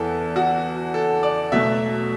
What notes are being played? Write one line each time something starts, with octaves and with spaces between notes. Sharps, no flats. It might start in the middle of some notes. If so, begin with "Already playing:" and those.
Already playing: E2 E3 B3 A4
F#4
A4
D5
B2 F#3 A3 E5